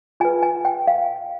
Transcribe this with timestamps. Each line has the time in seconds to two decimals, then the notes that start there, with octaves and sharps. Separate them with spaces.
0.20 F4 G#4 B4 G#5
0.42 G#5
0.65 G5
0.87 F5